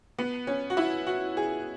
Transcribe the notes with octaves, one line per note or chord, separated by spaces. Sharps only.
B3
C#4
F#4
E4
F#4
G#4